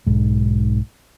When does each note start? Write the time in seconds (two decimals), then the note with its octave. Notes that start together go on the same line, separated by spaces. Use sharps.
0.07 B1 G#2